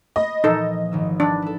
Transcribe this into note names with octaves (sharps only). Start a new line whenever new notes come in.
D#5 B5
A#2 E3 F3 D#4 A4
G#1 D#3 E6
D4 B4
E4 A4